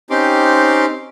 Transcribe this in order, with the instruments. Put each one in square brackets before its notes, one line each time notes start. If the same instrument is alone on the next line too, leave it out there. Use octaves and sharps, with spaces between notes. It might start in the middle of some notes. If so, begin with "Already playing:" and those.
[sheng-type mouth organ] C4 C#4 D#4 G4 C6 D6